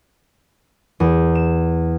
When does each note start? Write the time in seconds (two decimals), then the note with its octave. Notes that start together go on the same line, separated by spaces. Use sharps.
1.00 E2
1.35 E7